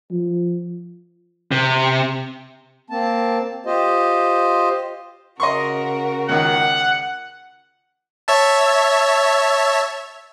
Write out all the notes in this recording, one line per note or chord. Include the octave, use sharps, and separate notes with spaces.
F3
C3
A#3 C4 A5
F4 G4 C5 D#5
C#3 F#4 A#4 D#5 C6 C#6
C#2 D#3 F#5
C#5 E5 A5